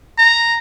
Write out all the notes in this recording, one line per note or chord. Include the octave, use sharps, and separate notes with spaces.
A#5